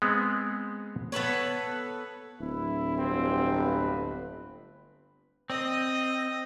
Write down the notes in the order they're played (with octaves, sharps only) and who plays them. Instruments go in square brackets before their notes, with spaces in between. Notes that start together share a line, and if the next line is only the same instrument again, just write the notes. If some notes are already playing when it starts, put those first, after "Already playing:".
[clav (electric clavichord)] G#3 B3 C4
[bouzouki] B3 A4 B4 C#5
[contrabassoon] D1 [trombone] E4
[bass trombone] G1 [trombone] C4
[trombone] B4
[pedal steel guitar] C4 [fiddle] D#5